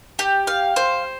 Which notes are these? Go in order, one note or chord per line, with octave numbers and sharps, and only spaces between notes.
G4
F5
C5